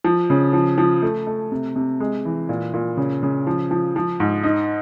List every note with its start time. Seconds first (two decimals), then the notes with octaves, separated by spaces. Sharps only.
0.04 F3
0.30 C#3
0.53 F3
0.78 F3
1.02 A3
1.27 A3
1.51 C3
1.76 C3
2.00 G#3
2.25 E3
2.49 A#2
2.74 A#2
2.97 C#3
3.23 C#3
3.47 F3
3.71 F3
3.96 F3
4.20 G#2
4.44 D#4